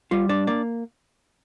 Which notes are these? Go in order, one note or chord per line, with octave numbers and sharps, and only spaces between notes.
G3 F4
D4 D5
A#3 D5